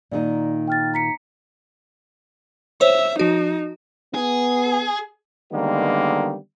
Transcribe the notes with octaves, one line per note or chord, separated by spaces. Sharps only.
A#2 D#3 D#4 D5
G5 F6 A6
A#5 B6 C#7
C5 C#5 E5
F3 D#4 F#4
B3 G#4
D3 D#3 G3 G#3 A#3 B3